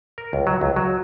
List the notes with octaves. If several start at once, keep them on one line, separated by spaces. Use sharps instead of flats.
A#4
C#2
F#3
C#2
F#3